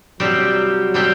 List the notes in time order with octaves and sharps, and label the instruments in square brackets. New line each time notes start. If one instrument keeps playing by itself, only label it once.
[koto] C3 G3 C4 G4 [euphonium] F#3
[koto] C3 G3 C4 G4